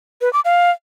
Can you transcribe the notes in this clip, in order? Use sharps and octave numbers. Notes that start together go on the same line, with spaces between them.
B4
D6
F5